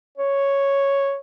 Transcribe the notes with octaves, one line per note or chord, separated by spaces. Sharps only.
C#5